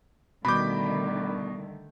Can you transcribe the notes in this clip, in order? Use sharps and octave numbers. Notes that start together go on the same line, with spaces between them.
B2 D3 D#3 G3 A3 B5 D6 G6